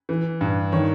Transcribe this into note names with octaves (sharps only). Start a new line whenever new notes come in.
E3
G2
D#3 C#5